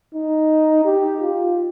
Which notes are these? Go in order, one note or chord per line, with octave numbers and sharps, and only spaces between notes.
D#4
G4
F4